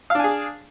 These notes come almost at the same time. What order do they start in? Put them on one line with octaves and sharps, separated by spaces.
F5 D4 G#5 G#4